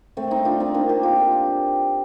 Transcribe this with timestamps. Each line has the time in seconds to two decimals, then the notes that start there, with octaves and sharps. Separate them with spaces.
0.17 A3 C4
0.31 C4 D#4
0.45 D4 F4
0.60 C4 D#4
0.74 A#3 D4
0.89 G4 A#4
1.03 F4 A4